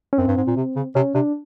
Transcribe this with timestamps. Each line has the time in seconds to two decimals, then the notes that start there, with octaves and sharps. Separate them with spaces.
0.13 C#4
0.18 F#2 C4
0.28 G2
0.37 G#2
0.47 A#2
0.57 C3
0.76 C#3
0.95 C3 C#4
1.15 C3 D4